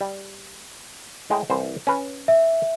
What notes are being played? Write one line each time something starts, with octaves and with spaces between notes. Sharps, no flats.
G3
A2 G#3 G5
C2 E3 C5
C#4 B4
E5